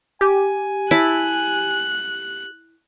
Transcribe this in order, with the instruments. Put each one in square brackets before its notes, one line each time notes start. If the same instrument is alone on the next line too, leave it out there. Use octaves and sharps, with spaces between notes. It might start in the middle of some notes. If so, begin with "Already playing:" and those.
[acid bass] G4 [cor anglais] G#5
[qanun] E4 A5 [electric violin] F#6